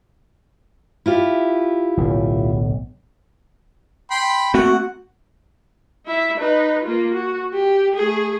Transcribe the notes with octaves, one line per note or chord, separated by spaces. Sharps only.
E4 F4 G4
D1 B1
G5 B5 C6
A3 A#3 C4 F#4 F#5
E4 E5
D#4 B4
A#3 F4
F#4
G4
A3 G#4